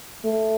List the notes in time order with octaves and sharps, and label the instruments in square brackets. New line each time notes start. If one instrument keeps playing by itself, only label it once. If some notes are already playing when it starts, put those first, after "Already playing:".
[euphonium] A3